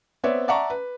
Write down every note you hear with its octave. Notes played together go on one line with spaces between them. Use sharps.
B3 C4 C#5 D5 E5
D5 E5 F#5 A5 A#5 C#6
B4